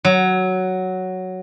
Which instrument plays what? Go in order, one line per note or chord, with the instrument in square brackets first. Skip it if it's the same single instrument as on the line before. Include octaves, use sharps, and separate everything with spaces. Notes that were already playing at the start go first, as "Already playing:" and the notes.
[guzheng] F#3